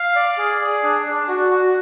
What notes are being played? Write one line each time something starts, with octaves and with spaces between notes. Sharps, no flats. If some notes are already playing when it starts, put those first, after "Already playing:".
Already playing: F5
D5
G#4
G#4
D4
D4
F#4
F#4